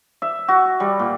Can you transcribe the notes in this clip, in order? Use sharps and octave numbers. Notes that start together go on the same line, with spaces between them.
E5
F#4
G3
A#2